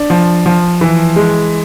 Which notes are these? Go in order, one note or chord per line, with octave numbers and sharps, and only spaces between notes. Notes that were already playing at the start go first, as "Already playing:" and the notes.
Already playing: D4
F3
F3
E3
G#3